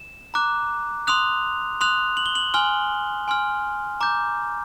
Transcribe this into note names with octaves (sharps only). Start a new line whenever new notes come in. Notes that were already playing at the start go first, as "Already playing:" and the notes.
Already playing: E7
A#5 D6 F#6
C6 D#6 F#6 F7
C6 D#6 F#6 F7
F#7
G7
F#7
G#5 C6 F6 G7
G#5 C6 F6
A#5 D6 G6